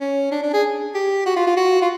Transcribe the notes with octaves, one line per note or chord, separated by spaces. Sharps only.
C#4
D4
D4
G#4
G4
F#4
F4
F4
F#4
F4